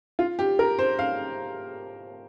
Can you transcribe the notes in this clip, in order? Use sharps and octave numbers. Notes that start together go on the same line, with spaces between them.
F4
G4
A#4
C5
F5